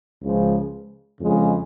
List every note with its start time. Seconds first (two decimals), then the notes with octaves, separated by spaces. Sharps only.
0.22 C#2 C#3 F3 G#3
1.19 F2 C#3 G#3